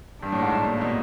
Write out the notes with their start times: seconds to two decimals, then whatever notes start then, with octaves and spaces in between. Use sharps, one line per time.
0.22 G2 D4
0.32 A2
0.42 G#2
0.61 A#2
0.77 A#2
0.81 B2